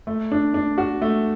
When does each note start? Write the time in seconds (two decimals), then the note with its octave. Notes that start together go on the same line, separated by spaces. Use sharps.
0.07 A3
0.32 D4
0.54 D4
0.78 F#4
1.02 A3